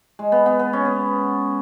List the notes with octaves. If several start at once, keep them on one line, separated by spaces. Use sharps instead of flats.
G#3
B3
B3
B3
C#4
B3